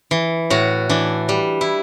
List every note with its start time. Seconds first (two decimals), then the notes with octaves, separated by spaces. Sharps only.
0.11 E3
0.50 A2 F#4
0.89 E3 D4
1.29 G3
1.61 E4